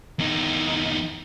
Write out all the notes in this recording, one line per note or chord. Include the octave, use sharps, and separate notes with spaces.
E2 D#4